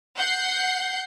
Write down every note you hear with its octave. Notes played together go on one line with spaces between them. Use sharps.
F#5 G6 C7